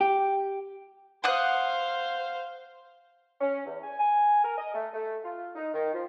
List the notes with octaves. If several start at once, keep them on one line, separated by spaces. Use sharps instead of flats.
G4
C5 F5 F#5 D#6 F#6
C#4
E2
G#5
G#5
A#4
D#5
A3
A3
F4
D#4
D#3
F3